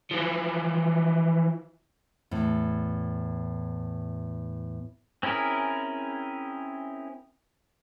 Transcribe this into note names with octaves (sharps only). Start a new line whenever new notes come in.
E3 F3
E2 A2
C4 C#4 E4 G#4 A#4